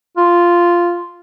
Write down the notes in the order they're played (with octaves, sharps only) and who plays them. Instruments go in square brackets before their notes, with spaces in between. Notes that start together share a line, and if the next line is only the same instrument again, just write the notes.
[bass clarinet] F4